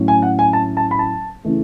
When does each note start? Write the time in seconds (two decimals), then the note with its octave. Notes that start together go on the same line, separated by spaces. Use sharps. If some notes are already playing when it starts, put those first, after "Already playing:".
Already playing: A2 F#3 C#4
0.08 G#5
0.22 F#5
0.39 G#5
0.53 A5
0.77 A5
0.91 B5
0.99 A5
1.45 C#3 E3 A3